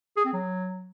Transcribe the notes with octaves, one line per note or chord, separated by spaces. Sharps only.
G#4
C4
F#3